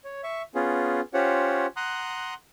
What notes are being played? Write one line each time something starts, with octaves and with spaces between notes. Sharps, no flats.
C#5
E5 C#6
B3 C#4 F4 G#4
C#4 F4 G4 C5 C#5 F#5
F#5 A#5 C6 D#6 F#6